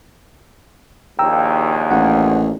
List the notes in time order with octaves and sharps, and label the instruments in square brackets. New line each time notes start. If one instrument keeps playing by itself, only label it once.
[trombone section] A#1 D#2 [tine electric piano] G5 A#5 E6
[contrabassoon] A1 [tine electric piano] F#5